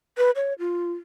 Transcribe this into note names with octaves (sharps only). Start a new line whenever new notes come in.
B4
C#5
F4